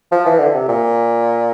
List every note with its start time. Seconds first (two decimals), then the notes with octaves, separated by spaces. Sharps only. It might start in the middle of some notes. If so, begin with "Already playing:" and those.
0.12 F3
0.26 E3
0.39 D3
0.54 C3
0.68 A#2